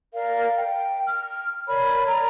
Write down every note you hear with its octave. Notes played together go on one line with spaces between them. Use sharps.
A#4 D5 F5
G5
F6
A#4 C#5 D5 B5
A#4 D5 A#5